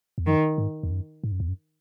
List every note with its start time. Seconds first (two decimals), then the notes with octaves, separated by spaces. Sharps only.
0.18 E2
0.26 F#2 D#3
0.58 G#2
0.83 E2
0.91 F#2
1.24 G#2
1.32 F#2
1.40 E2
1.48 F#2